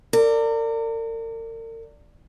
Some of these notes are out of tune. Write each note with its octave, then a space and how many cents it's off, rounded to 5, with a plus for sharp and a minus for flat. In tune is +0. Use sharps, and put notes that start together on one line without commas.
A#4 -40 D5 +0